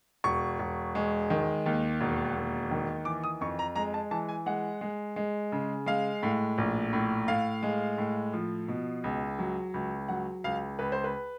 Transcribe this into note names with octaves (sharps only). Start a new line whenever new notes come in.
E1 C#6
E1
G#3
D#3
D#2
E1
D#2
D#3
E3 D6
D#6
F2 C#6
A#5
G#3 A#5
A5
E3 A5
G#5
G#3 F#5
G#3
G#3
C#3
G#3 F5
A2
A#1
A2
A2 F5
G#3
A2
F3
B2
C#2
F#3
C#2
F#3 F#5
C#2 F5
C#2 B4
C5
B4